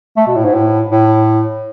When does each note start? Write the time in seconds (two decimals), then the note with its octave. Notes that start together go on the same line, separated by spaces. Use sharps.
0.17 A3
0.27 B2
0.35 A2
0.45 G#2
0.54 A2
0.91 A2